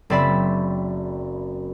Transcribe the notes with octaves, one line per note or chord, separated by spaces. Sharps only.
F#1 C4 D5 E5 B5